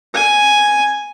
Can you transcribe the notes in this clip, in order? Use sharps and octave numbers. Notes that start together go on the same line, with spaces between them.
G#5